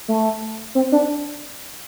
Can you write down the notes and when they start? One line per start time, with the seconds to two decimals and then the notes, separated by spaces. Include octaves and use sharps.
0.08 A3
0.75 C4
0.92 D4